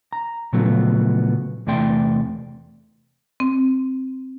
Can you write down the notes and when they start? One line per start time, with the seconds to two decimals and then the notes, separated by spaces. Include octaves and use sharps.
0.13 A#5
0.53 A#2 C#3 F3 F#3 A3 B3
1.67 E2 C3 A3 D5 G5 C6
3.40 C4